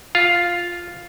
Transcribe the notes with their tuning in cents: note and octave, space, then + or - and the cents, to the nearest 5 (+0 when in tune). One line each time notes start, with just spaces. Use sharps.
F4 +0 F5 +0